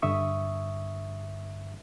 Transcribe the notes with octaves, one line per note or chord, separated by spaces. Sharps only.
G2 D3 E5 C#6 D#6